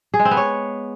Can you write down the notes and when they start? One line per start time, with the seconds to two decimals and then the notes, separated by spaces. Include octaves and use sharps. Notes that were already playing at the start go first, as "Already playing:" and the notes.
0.14 G#4
0.19 G#3
0.25 C4
0.31 B3
0.37 C#5